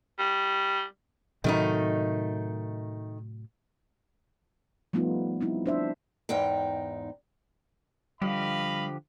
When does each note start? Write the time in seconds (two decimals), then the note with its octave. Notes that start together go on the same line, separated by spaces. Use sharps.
0.19 G3
1.44 A2 C3 D#3 F#3 A3 D#4
4.93 F3 G3 A3 B3 D#4 F4
5.41 G3 C4 D#4 E4
5.66 D4 C5 E5
6.29 E2 G#2 D#4 G5
8.22 D3 F3 G3 G4 D#5 F5 B5